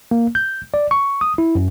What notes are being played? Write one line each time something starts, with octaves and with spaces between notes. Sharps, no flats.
A#3
G6
D5
C#6
D#6
E4
F#2